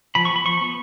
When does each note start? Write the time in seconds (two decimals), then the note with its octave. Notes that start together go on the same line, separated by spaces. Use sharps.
0.15 F3 B5
0.25 C#6
0.30 B3
0.36 B5
0.45 F3 C#6
0.61 B3